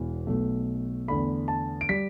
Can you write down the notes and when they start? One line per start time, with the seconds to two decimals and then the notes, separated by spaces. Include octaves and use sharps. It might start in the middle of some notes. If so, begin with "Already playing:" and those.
Already playing: E1 E2 E3
0.27 B1 B2 A3
1.08 E2 D3 A3 B5
1.48 A5
1.81 D7
1.89 G3 B6